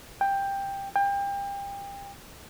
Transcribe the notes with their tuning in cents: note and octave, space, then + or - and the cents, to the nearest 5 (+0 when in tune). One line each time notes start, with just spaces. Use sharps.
G5 +10
G5 +30